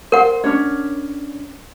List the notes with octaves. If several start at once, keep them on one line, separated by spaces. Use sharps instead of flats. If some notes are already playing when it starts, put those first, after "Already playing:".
A#4 C5 F#5
C#4 D4 C#5